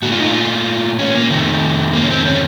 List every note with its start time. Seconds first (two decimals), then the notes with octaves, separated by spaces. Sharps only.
0.02 A#2 A3 F#4
0.12 F4
0.19 D#4
0.27 F4
0.99 C#4
1.15 A#3
1.30 F2 C3 D#3 A3
1.93 A#3
2.03 C#4
2.10 C4
2.26 C#4